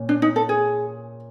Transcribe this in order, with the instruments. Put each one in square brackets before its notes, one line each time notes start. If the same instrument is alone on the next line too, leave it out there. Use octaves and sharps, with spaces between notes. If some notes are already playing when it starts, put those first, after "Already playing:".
Already playing: [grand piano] A#2 C#4
[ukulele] D4
D#4
A4
G#4